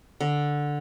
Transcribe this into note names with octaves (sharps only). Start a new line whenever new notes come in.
D3